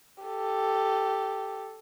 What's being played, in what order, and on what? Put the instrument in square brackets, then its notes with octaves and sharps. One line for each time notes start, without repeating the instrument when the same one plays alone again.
[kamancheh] G4 A4